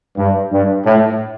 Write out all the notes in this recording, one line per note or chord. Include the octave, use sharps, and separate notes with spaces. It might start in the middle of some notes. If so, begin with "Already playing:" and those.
G2
G2
A2